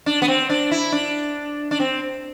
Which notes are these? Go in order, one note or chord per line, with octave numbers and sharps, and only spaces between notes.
D4
B3
C4
D4
E4
D4
D4
C4